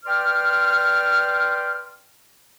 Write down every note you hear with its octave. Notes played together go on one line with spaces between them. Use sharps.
B4 D5 G5 C6 F6